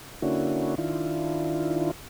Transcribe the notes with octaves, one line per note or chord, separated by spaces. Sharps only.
D3 A#3 C#4 D4 E4 F#4
D#3 D4 E4 F4